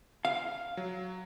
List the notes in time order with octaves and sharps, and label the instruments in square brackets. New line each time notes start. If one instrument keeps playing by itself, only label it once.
[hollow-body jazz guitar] F5
[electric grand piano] F#3